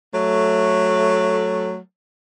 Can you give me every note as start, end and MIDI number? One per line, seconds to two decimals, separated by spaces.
0.12 1.76 54
0.12 1.76 57